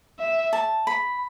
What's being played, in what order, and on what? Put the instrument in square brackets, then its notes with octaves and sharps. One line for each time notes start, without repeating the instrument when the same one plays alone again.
[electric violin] E5
[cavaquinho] A5
B5